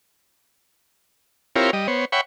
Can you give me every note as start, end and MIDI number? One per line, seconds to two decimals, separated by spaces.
1.56 1.71 60
1.56 1.71 64
1.56 1.71 65
1.56 1.71 67
1.56 1.71 70
1.56 1.71 73
1.73 1.87 55
1.73 1.87 75
1.88 2.05 59
1.88 2.05 72
1.88 2.05 73
2.12 2.21 73
2.12 2.21 76
2.12 2.21 78
2.12 2.21 79
2.12 2.21 83
2.12 2.21 85